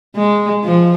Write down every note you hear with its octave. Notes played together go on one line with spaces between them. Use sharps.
G#3
F3